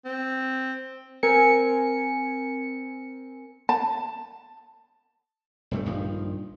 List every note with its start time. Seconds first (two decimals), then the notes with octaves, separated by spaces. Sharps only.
0.05 C4
1.23 C4 A#4 G#5 C#7
3.69 A5
5.71 E1 G2 A3
5.86 A#1 G2 D#3 F3